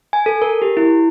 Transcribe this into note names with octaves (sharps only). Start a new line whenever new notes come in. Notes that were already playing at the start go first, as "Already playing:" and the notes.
G#5
A4
A#4
G4
E4